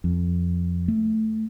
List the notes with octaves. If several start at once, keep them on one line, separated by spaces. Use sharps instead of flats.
F2
A3